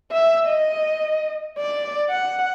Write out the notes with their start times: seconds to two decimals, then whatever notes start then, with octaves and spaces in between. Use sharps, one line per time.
0.12 E5
0.48 D#5
1.58 D5
2.10 F#5